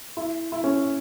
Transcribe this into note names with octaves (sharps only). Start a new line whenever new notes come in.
E4
E4
C#4